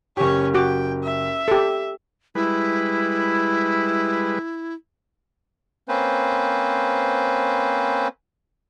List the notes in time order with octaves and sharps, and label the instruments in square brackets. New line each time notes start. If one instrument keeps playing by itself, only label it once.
[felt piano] F#1 G4 [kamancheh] C#4 C#5
[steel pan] F#4 D6 [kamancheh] G5
[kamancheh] E5
[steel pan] G4 A4
[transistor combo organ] G3 G#3 B4 [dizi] E4
[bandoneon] A#3 C4 C#4 B4 C5